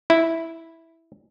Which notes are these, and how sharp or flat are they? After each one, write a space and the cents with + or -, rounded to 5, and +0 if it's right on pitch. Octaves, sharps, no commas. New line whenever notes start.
E4 -5